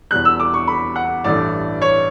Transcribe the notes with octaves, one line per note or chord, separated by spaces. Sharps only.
E2 B2 G3 F#6
E6
D6
C#6
B5
F#5
A1 G2 E3 A3 D5
C#5